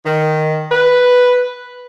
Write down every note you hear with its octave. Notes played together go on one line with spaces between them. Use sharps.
D#3
B4